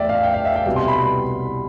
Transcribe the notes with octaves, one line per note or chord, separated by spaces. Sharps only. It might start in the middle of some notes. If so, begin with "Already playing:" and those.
Already playing: E2 A3 D5 E5 G5
F5
G5
F5
E5
G5
C2 B2 G3
C6
B5